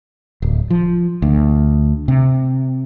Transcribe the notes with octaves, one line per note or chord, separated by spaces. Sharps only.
D1
F3
D2
C3